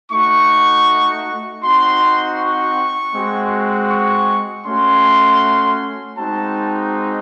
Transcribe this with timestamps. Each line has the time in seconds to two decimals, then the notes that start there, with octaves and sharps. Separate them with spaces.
0.12 A3 D#4 F#4 C#6
1.63 C4 D#4 F#4 C6
2.40 C#6
3.15 G#3 C4 F#4
3.91 C#6
4.67 A3 C#4 F#4 C6
6.18 G#3 C4 D#4 F#4 A5